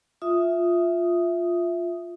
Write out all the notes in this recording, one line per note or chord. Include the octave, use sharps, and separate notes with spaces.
F4 E5 D#6